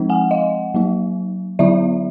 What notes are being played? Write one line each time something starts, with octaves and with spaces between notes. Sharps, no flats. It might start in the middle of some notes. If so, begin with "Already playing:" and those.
Already playing: F3 G#3 C4 D#4
F#5 G#5
D#5 F5
F#3 A#3 D#4
D3 F#3 B3 E4 D5 E5